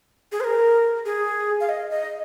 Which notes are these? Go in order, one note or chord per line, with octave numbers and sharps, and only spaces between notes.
G#4
C5
A#4
G#4
F5
D#5
D#5